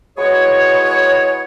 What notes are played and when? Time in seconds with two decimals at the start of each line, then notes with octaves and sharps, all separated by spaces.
0.17 G#3 B3 E4 F#4 G#4 C#5